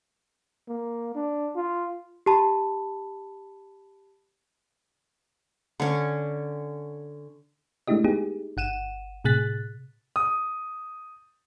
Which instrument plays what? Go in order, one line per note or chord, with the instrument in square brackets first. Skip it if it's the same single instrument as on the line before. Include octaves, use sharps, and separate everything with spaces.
[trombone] A#3
D4
F4
[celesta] G4 A5 B5
[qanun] D3 C#4
[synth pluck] G#3 A3 D4 E4 G4 D#5
B3 D#4 G4 G#4
G1 F#5 D#7 E7
A2 C3 G#4 F#6 A6 B6
[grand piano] D#6